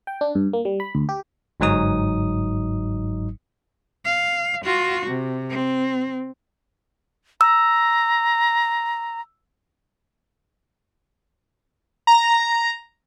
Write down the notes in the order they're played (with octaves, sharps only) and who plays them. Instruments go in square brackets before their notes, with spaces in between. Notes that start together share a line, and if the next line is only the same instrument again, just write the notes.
[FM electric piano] G5
D4
G2
A#3
G3
B5
D2
G4
[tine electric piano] G1 G#2 F#3 D#4 D#6
[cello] F5
F4 F#4
C3
C4
[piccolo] A#5 [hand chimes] E6
[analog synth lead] A#5